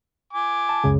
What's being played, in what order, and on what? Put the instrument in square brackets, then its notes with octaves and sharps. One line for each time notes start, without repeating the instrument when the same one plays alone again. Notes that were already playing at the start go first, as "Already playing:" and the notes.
[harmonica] G#5 D6
[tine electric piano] A5
C#2 F#2 C#3